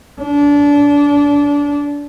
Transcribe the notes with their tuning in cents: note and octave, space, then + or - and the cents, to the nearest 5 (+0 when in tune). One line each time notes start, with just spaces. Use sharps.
D4 -25